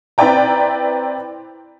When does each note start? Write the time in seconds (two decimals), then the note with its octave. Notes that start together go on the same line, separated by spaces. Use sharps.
0.18 C4 E4 B4 D5 G5 A#5